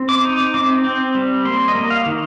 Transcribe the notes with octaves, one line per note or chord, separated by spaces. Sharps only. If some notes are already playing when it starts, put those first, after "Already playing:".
Already playing: C4
D6
D#4
C4 D6
C4
G3
A#3 C6
D#5
A#3
F5
D#3